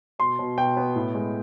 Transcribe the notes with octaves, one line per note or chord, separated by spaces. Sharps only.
B2 C6
B2
B2 G5
B3
A2
G#3